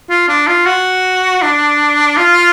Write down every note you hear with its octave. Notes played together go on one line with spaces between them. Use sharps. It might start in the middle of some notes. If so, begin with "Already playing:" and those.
F4
D4
F4
F#4
D4
F4